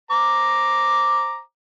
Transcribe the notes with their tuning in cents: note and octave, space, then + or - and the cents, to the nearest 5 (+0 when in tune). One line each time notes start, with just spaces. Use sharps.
C5 +20 A#5 +0 D6 +0